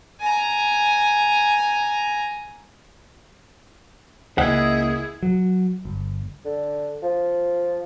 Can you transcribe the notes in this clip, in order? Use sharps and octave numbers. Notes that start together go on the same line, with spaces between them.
G#5 A#5
C#2 A#3 E4 G#4 D#5 E5 F#5
F#3
G1
D3
F3